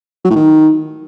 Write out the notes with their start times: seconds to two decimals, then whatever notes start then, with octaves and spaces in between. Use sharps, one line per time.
0.24 F#3
0.30 A2
0.36 D#3